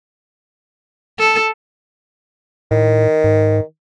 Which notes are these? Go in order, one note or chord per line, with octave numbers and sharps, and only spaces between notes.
A4
A2 D#3
G#2